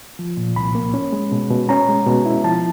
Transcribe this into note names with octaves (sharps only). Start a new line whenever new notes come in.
F3
A#2
C2 B5
A#3
C#4
G#3
B2
B2
C#4 A#5
G#3
B2
E4
F3 A5